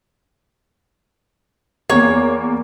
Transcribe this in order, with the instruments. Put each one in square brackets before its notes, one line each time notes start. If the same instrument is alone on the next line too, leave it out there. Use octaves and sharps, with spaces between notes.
[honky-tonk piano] E2 A#3 [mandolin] C#5